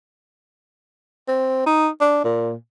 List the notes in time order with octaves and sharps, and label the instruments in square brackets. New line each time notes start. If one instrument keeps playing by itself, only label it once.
[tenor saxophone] C4
D#4
D4
A#2